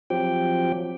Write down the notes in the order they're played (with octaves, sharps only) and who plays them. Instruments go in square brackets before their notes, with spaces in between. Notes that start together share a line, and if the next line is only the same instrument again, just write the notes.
[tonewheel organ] F3 F#3 C4 G4 G5